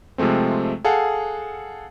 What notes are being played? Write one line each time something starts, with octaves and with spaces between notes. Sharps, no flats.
C3 F3 G#3 A3 C4
G#4 A4 F5 F#5